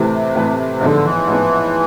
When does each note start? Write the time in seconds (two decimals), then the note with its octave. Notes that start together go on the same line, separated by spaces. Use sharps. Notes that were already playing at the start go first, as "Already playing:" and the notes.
Already playing: A2 C3 E3 A3 E4 B4
0.35 A2 E3 A3 E4 B4
0.81 A1 G#2 D3 F3 B3
1.04 E3
1.28 A1 G#2 F3 B3